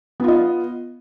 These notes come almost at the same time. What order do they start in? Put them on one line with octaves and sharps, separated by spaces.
B3 F4 D#5